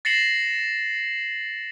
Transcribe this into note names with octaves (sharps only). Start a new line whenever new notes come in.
A6 A#6 C7 C#7 E7 F#7